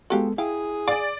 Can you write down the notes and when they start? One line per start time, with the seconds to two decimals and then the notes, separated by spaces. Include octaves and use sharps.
0.10 G#3 B3 F#4 G4 A4 F5
0.38 E4 G#4 F5 G5
0.88 D5 F5 G#5